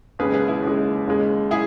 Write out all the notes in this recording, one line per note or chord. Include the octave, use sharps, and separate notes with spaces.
D#2 C#3 G#3 G#4 B4
G#4 B4
E4 G#4
D#2 C#3 G#3
D#2 C#3 G#3
E4 G#4